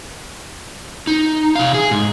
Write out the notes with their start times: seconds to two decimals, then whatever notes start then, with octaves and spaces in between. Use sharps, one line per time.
1.07 D#4
1.55 C3 F5
1.74 G#4
1.91 G#2